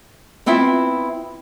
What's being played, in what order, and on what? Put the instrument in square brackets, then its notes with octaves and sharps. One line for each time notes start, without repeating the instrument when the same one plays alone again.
[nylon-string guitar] B3 C4 E4 F4 E5